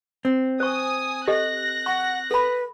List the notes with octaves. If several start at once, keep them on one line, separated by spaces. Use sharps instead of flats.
C4
C5 G#5 C#6 D#6
G4 A4 D#5 F#6 A#6
F#5 C#6
A4 B4 B5